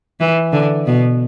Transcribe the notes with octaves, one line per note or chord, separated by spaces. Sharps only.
E3
D3
B2